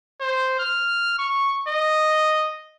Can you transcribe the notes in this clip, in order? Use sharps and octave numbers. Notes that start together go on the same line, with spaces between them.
C5
F6
C#6
D#5